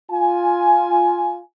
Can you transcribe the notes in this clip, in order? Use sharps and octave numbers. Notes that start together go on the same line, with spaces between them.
F4 G#5